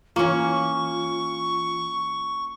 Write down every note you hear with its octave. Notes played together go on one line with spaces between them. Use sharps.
E3 A#3 C#4 F4 C#6